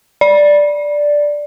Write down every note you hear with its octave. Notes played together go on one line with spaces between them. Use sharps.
D5